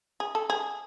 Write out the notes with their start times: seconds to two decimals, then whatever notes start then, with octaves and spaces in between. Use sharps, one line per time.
0.20 G#4
0.35 A4
0.50 G#4